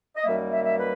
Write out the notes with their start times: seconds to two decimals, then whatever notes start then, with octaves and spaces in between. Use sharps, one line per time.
0.17 D#5
0.24 F#2 D#3 G3 A#3 E5
0.51 E5
0.65 E5
0.78 B4